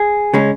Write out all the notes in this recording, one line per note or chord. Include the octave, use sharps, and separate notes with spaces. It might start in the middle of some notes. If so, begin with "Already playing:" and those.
Already playing: G#4
C#3 G#3 C#4